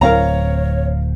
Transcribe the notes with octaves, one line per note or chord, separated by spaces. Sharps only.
D1 C4 A#4 C#5 F5 A#5